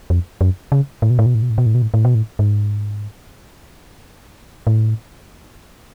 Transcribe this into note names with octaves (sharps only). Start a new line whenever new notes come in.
F2
F#2
C#3
A2
B2
A2
B2
A2
B2
A2
B2
A2
B2
A2
A2
B2
A2
G#2
A2